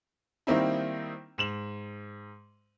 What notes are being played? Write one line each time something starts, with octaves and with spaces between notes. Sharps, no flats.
D#3 G3 A#3 C4 D#4 E4
G#2 E7 F#7